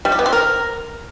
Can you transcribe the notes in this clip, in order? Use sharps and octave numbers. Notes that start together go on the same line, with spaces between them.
G3
G4
B3
C4
A#4